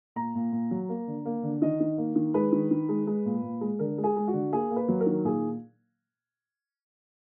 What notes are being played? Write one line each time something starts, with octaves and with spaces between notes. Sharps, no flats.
A#2 A#5
A#2
A#2
F#3
A#3
D3
A#3
D3
D#3 D#5
D#3
A#3
D#3
G#3 B4
D#3
D#3
G#3
G#3
A#2
A#2
G#3
D3 A#4
G#3
G#4
G#3
F#4
D3
A#3 G#4
A#3
B4
F#3
A#4
D#3
A#2 G#4